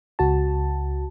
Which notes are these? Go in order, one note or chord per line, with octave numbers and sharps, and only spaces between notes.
C#2 F#4 A5